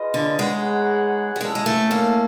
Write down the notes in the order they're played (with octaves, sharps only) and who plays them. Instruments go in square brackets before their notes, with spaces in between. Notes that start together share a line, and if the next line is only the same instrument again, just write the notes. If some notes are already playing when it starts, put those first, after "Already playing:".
Already playing: [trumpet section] F4 G#4 B4 D#5
[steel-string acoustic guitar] D3
[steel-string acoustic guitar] G#3 [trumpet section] B3 D#4 G#4 C#5 F#5
[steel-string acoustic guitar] G3
[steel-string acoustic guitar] G#3 [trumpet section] C#4 E4 A4
[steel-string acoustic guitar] G#3
A3
A#3